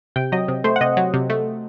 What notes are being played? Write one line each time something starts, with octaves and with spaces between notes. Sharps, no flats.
C3 G5
F#3 D#5
C3
A3 C5
F#5
C3 D#5
F#3
C3
A3